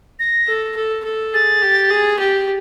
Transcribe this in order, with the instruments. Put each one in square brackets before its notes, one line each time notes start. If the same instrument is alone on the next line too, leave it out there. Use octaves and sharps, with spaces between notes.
[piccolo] A#6
[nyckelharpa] A4
A4
A4
[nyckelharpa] G#4 [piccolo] A6
[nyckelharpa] G4
G#4
G4